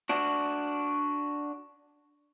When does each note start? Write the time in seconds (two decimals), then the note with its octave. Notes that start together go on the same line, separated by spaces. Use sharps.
0.09 D4 F#4